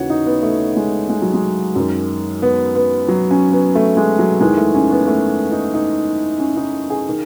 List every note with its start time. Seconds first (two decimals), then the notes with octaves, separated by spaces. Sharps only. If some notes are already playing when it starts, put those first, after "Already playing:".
Already playing: D#2 C#3 E3 F#4 C#5
0.10 D#4
0.27 B3
0.43 A3
0.77 G#3
1.09 G#3
1.22 F#3
1.34 G#3
1.75 F#2 D#3
2.42 B3
2.76 B3
3.08 F#3
3.31 C#4
3.52 B3
3.75 A3
3.97 G#3
4.19 F#3
4.41 E2 D#3 G#3
4.57 A3
4.75 C#4
4.91 B3
5.07 A3
5.52 D#4
5.74 D#4
6.40 C#4
6.57 D#4
6.90 G#4
7.09 D#3